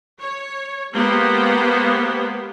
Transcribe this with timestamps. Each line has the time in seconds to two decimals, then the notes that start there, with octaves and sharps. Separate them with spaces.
0.21 C#5
0.93 G#3 A#3 B3 G4 C5